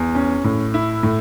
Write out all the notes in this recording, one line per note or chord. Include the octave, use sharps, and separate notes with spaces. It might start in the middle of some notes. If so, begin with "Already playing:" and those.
Already playing: E2
C#4
A2
E4
A2